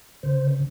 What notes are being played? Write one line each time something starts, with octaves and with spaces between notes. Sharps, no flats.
C#3 C5